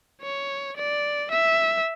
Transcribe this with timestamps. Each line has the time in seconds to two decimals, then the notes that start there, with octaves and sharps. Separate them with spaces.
0.21 C#5
0.77 D5
1.31 E5